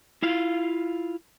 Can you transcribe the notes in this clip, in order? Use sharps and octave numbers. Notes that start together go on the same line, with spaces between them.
E4 F4 F5